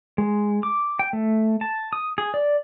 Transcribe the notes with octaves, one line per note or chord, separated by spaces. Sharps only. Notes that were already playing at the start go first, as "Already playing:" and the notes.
G#3
D6
G5
A3
A5
D#6
G#4
D5